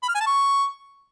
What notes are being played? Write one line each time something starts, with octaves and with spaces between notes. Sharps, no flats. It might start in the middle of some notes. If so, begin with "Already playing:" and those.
B5
F6
G#5
A5
C#6